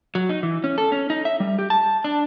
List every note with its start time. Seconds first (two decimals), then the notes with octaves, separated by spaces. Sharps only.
0.15 F#3
0.29 D#4
0.43 E3
0.64 C#4
0.78 A4
0.92 C#4
1.10 D#4
1.25 E5
1.40 G3
1.59 G4
1.70 A5
2.04 D4